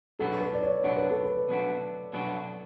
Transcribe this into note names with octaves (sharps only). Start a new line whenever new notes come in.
B2 F#3 B3 D4 F#4 A4
B4
D5
C#5
B2 F#3 B3 D4 F#4 C#5
B4
A4
B4
B2 F#3 B3 D4 F#4
B2 F#3 B3 D4 F#4